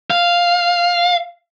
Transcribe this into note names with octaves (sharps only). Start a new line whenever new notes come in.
F5